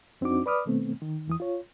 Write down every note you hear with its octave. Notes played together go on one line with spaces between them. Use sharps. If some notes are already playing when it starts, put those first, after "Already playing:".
F2 C4 D4 D#4 F#4 D6
B4 D5 B5 D6 D#6 F6
B2 D#3 A3 B3 C4
D#3
E2 E3 D#6
F4 C#5